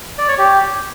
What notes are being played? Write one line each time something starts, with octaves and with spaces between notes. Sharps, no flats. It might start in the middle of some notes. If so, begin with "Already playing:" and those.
D5
C#5
G4